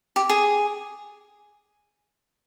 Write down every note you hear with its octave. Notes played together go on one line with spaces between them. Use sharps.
G4
G#4